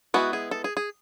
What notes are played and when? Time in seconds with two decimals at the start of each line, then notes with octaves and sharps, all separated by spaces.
0.14 G#3 B3 E4 F#4
0.33 G#4
0.51 A4
0.64 G#4
0.77 G#4